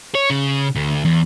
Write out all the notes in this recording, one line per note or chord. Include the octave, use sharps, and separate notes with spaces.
C#5
C#3
D2
E2